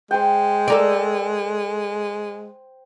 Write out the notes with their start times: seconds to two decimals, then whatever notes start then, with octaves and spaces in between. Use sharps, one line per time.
0.11 G#3 C5 G5
0.68 A4 A#4 D5